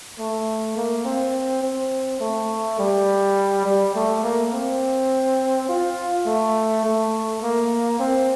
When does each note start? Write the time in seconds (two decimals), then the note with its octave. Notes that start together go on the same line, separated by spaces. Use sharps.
0.19 A3
0.76 A#3
1.05 C4
1.62 C4
2.20 A3
2.79 G3
3.65 G3
3.95 A3
4.23 A#3
4.52 C4
5.68 F4
6.26 A3
6.84 A3
7.42 A#3
7.99 C4